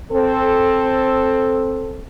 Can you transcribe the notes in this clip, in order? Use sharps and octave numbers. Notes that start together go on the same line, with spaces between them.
C4 A4